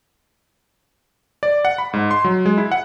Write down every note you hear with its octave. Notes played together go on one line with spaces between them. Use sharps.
D5
F#5
B5
G#2
C6
F#3
G#3
E4
F#5